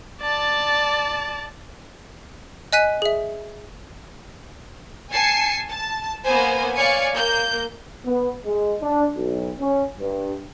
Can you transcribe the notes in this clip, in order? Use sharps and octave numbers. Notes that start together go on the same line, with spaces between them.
D5 A5
D#5 G#5 F#6 B6 D#7
G#4 E5
G#5 A5 C7 C#7
A5
A#3 B3 C5 G#5
C#5 D5 F5 G#5 C#7
A#3 G6
B3
G#3
D4
B1
C#4
G2